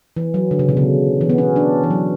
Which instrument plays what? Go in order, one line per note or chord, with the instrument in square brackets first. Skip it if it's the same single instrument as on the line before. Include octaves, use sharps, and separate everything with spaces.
[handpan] E3
F#3
D3
C#3
B2
C#3
E3
B3
C#4
D4
E3
F#3